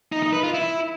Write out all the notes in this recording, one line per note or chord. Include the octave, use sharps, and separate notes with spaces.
D#4
D#4
B4
F4
E4